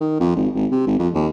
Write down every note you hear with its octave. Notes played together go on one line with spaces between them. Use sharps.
D#3
F2
G#1
G#1
C3
G#1
F2
D#2